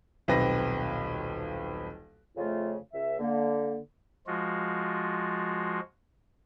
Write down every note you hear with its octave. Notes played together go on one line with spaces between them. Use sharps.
D#1 B1 C4 G4 B4 A#6
F2 C#3 A3 F4
C#2 E5
D3 A#3
F3 G#3 F4 F#4